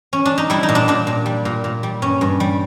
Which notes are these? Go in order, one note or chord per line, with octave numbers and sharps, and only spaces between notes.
C#4
D4
D#4
G3 E4
D#4
A#2
D4
A#2 D4
A#2
G3
A#2
A#2
G3
G2 C#4
G2
G3